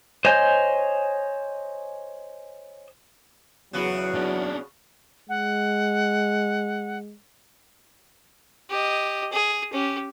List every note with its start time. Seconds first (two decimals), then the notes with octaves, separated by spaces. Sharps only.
0.25 C5 C#5 D#5 G#5 G6
3.73 E2 C#3 F#3 B3 F#4
4.15 C#4 D4
5.29 G#3 F#5
8.70 G4 D#5
9.32 G#4
9.73 C#4 G4